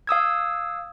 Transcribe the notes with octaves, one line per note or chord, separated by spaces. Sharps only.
F5 D#6 E6 G#6